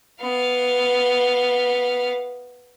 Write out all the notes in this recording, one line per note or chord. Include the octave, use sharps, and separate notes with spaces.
B3 F5